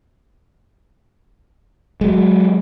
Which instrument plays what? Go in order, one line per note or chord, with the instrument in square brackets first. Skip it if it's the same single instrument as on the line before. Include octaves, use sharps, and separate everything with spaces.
[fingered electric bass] F#3 G#3